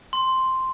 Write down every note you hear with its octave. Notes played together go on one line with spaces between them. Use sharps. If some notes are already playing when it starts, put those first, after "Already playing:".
C6